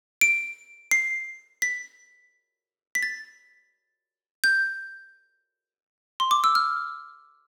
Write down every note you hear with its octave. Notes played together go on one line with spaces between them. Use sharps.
D7
C7
B6
B6
A6
G6
C6
D6
E6
F6